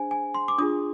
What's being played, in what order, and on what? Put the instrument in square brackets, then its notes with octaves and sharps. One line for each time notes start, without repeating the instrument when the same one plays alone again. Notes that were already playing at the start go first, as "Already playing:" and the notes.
Already playing: [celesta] D4 G#4 C5 G#5
G#5
C6
D6
D4 F4 G#4 D#6